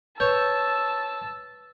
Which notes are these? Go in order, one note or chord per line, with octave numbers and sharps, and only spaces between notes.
B4 C#5 A5 E6 G6